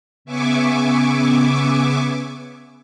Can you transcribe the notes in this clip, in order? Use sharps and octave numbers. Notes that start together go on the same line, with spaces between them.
C#3 B3 E5 G#5 C#6 D6